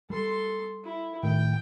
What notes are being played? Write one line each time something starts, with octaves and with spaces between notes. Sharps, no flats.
G3 A4 C6
E4
A2 D#3 A3 G5